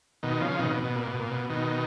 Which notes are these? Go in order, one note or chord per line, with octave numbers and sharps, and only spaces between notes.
B2 D#3
C#3 F3
B2 D#3
B2
B2
A#2
B2
A#2
B2
B2 D#3